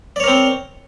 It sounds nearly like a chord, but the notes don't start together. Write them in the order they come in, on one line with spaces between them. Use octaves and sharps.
D5 C#5 A#4 C4